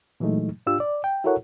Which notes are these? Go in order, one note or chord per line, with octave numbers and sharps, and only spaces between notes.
A#2 E3 F#3 G#3 A3 D#4
G#2 D4 F4 G4 E6
D5
G5
E4 F#4 A4 A#4 C#5 F#5